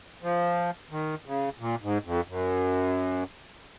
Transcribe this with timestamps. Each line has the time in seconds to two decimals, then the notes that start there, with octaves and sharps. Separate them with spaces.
0.23 F3
0.91 D#3
1.26 C#3
1.59 A#2
1.82 G#2
2.05 F2
2.28 F#2